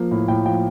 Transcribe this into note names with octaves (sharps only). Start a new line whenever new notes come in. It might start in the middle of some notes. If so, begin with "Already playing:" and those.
Already playing: F3 A#3
A2
A2 G5
F3 G5